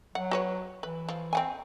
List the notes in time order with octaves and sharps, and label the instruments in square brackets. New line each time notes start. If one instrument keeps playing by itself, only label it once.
[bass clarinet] F#3 [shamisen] F#5
[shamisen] F#4 B4 C#5
[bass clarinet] E3 [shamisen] B4
[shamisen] F3
C4 F#5 G#5